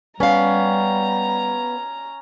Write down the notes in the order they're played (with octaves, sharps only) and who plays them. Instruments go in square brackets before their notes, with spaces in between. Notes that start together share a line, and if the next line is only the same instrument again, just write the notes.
[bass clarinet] G3 [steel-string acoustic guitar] B3 F5 [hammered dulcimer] C#4 [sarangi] A#5